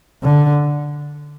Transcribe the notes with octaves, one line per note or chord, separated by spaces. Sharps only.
D3